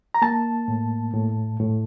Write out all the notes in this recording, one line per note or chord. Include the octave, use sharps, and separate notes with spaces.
A#5
A#3 A5
A2
A2
A2